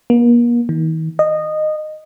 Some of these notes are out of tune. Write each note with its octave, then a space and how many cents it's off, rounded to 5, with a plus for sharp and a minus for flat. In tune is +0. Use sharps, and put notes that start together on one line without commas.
A#3 +40
D#3 +45
D#5 -15